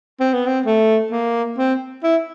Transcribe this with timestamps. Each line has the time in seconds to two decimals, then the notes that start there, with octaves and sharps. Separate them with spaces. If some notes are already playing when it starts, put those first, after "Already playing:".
0.20 C4
0.33 B3
0.46 C4
0.65 A3
1.11 A#3
1.58 C4
2.03 E4